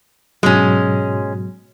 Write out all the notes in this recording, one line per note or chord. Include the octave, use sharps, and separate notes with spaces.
G#2 B2 F#3 G#3 C#4